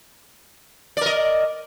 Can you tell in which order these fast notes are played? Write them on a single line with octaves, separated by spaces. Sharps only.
D5 A#4 D#5